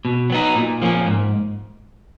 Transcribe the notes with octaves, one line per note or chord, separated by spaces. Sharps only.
B2
F#3 B3 D#4
A#2
F3 A#3 C#4
G#2